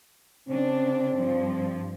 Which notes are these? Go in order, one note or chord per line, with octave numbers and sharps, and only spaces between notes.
C#3 C4 D4
G2 F3